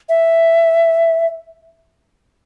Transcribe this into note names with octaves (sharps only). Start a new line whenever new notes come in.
E5